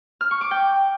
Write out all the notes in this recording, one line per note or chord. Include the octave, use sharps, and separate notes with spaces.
F6
C#6
D6
G5